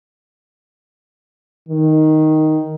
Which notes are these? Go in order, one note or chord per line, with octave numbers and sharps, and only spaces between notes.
D#3